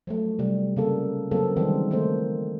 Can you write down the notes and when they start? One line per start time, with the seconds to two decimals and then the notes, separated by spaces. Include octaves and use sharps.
0.07 F3 F#3 A3
0.39 C3 G3
0.77 C#3 A#3 A4
1.31 C#3 F#3 A#3 C4 A4
1.56 D#3 E3 G3 G#3 C4
1.91 D#3 A3 A#3 C4 C5